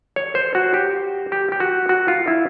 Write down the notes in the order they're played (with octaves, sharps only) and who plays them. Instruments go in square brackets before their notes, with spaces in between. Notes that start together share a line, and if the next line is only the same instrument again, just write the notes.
[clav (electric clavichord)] C#5
C5
F#4
G4
G4
G4
F#4
F#4
F4
E4